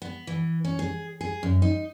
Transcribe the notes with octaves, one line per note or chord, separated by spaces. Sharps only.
B3
E3
C#4
G#4
G#4
F#2
D#4